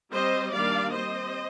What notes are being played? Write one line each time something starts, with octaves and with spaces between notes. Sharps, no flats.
G3 C4 C5 D#5
D#3 G3 A#3 D4 D5 F5
G3 C4 C5 D#5